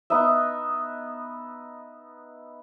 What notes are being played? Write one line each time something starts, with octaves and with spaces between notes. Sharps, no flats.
B3 D#4 D#5 E5